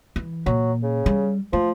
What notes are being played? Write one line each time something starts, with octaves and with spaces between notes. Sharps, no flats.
E3
A#2 F#3
C#3
G3
F3 A3